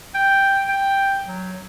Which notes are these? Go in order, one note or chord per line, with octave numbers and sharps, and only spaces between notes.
G5
G5
F#3